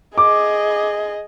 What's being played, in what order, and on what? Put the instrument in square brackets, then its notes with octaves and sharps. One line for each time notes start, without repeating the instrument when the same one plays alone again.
[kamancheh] G#4 D#5 [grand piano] D6